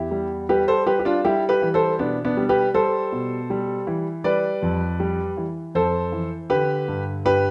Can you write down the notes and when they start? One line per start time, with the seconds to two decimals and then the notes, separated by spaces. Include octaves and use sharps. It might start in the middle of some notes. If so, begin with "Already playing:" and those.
Already playing: E2 E4 G4
0.11 G3
0.49 G3 G4 B4
0.68 A4 C5
0.86 G3 G4 B4
0.99 G4
1.05 D4 F4
1.25 G3 E4 G4
1.49 G4 B4
1.62 E3
1.74 A4 C5
1.99 B2 B3 D4
2.25 B3 D4
2.37 G3
2.49 G4 B4
2.74 G3 A4 C5
3.12 B2
3.50 G3
3.87 E3
4.24 G3 B4 D5
4.63 F2
5.00 G3
5.37 E3
5.75 F2 A4 C5
6.12 E3
6.50 D3 G4 B4
6.88 G2
7.25 G2 G4 B4